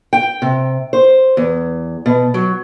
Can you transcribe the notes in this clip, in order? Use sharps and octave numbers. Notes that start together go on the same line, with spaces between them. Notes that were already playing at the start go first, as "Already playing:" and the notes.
G5
C3
C5
E2
B2
F#3